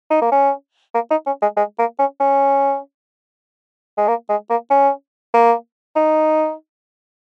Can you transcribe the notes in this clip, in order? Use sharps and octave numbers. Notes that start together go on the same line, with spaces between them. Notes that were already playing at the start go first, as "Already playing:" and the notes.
D#4
A#3
C#4
A#3
D#4
C#4
G#3
G#3
A#3
C#4
C#4
G#3
A#3
G#3
A#3
C#4
A#3
D#4